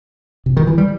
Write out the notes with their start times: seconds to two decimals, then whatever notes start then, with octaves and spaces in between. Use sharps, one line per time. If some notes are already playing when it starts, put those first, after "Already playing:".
0.46 C3
0.57 D#3
0.67 E3
0.78 G3